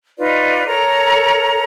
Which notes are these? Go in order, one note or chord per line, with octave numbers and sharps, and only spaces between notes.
D#4 F4 B4 D5
A4 A#4 C#5 A#5